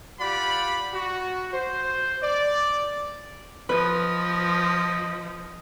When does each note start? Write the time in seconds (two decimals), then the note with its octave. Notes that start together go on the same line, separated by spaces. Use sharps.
0.20 F4 G4 D5 F#5 B5
0.93 F#4
1.52 C5
2.22 D5
3.69 F3 B4 D#5